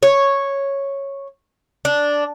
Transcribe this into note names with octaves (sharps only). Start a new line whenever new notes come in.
C#5
D4